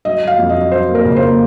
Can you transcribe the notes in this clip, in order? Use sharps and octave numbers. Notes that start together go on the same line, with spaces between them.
F#3 D#5
F#3 F5
F2
D#5
F#3
F#3 C5
A#3
A#4
C#3
C5
A#3